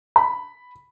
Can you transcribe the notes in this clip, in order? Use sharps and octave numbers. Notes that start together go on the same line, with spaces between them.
B5